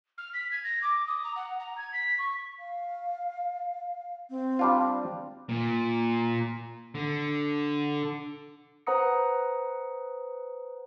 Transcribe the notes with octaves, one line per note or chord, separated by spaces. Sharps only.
F6
B6
G#6
A#6
D6
D#6
A#5
F#5
A#5
G#6
B6
C#6
F5
C4
G3 D4 F4
A#2
D3
B4 C5 F#5 A#5 D#6 C#7